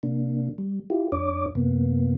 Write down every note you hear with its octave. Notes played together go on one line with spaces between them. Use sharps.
C3 A#3 D4
G3
E4 F4 G4
F2 D4 C#5 D6
F#2 C3 A#3 B3